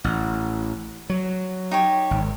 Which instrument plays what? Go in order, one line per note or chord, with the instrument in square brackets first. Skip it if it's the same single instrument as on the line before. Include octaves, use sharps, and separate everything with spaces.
[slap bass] A1 [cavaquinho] F#5
[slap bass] F#3
[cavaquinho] D#4 G4 C#5
[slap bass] G#1